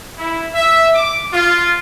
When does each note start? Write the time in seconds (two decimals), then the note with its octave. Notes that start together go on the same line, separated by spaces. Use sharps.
0.18 E4
0.54 E5
0.94 D6
1.33 F4